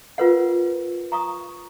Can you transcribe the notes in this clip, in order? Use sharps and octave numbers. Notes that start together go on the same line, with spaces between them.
F4 A#4 B4 C#5 F#5
A#5 C#6 D#6